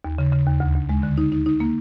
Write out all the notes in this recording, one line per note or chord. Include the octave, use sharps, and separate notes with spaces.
D#2
C#3
C#3
D#2
D2
D2
G#3
D3
D#4
D#4
D#4
A#3